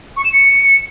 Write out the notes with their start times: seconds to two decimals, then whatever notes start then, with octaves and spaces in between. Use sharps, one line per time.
0.16 C#6
0.24 E7
0.32 C#7